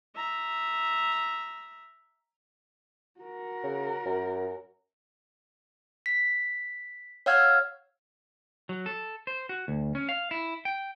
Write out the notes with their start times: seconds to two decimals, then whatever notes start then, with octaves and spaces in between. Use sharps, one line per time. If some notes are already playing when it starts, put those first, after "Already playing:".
0.15 E5 A#5
3.20 F#4 A#4
3.64 C#3
4.06 F#2
6.06 B6
7.26 C#5 F5 F#5 E6 F6 G#6
8.69 F#3
8.86 A4
9.27 C5
9.49 F#4
9.68 D2
9.95 C#4
10.09 F5
10.31 E4
10.65 G5